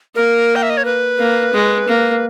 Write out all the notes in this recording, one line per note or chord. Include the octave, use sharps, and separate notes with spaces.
A#3 A#4
G5
E5
D#5
C#5
B4
A#3
G#3
A#3